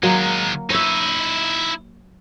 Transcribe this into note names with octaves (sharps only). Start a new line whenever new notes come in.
D#3 F#3 G#3 A#3
D#4 E4 C#5 E5